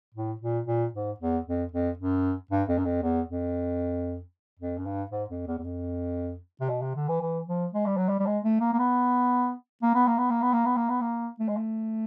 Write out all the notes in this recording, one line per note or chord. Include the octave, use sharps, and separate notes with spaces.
A2
A#2
A#2
G#2
E2
F2
F2
F#2
G2
F2
F#2
F2
E2
F2
F2
F#2
G2
G#2
F2
E2
E2
F2
C3
B2
C3
D3
E3
E3
F3
G#3
G3
F#3
G3
G3
G#3
A3
A#3
A#3
B3
A#3
B3
A#3
B3
A#3
B3
A#3
B3
A#3
B3
A#3
A3
G#3
A3